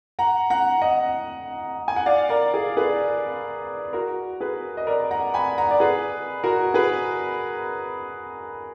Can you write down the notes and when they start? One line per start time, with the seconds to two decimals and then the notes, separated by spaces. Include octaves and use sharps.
0.19 F#5 A#5
0.50 F#5 A#5
0.81 D#5 F#5
1.88 G#5
1.96 F#5
2.06 D5 F5
2.29 A#4 D5
2.54 G#4
2.77 G#4 B4
3.93 F#4 A#4
4.41 G#4 B4
4.77 D#5
4.87 A#4 D5
5.11 F#5 A#5
5.34 G#5 B5
5.58 F#5 A#5
5.71 D5
5.80 G#4 B4
6.44 F#4 A#4
6.74 G#4 B4